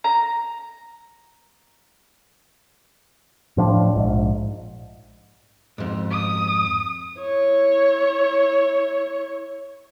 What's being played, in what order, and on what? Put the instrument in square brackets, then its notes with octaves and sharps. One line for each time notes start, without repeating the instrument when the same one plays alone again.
[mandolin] A#5
[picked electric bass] A2 F3 D4
A#1 G#2
[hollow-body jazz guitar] F2 G#2
[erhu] D#6
[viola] E4 C#5